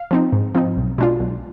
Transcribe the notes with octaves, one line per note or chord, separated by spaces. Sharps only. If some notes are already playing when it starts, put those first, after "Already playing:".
Already playing: F5
F3 C4 D#4
G#2
F3 C4 D#4
B1
B2 G#3 D4 F4
B1